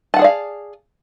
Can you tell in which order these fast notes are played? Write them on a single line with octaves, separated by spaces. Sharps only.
A5 F#5 G#4 D5 F5